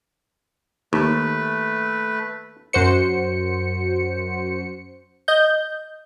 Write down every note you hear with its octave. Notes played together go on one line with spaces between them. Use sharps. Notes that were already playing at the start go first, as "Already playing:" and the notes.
D#2 A3 B4
F#2 F#4 C5 C#7
D#5 G6